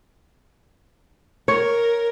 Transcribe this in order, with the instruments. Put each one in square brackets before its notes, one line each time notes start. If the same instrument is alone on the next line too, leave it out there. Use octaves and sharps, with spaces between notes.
[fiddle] A#4 [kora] C#5